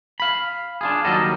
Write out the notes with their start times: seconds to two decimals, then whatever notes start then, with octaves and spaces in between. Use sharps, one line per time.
0.20 F5 B5
0.81 D4 F4 G#4
1.04 D#2 F#3 G3 A4 A#4 D#5